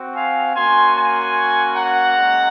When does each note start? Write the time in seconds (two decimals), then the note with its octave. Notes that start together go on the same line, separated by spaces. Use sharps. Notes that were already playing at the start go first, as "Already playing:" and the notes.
Already playing: C4 F#4
0.14 F5 G#5
0.54 A#3 C#4 F#4 G#5 C6
0.94 G#5 C6
1.75 F#5 A#5
2.16 G#3 C#4